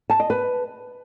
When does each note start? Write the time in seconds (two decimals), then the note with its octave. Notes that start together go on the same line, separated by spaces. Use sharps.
0.10 A5
0.20 D#5
0.30 B4